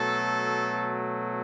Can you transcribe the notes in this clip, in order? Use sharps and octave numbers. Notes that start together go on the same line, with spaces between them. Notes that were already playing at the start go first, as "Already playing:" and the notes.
Already playing: B2 F#3 A3 A4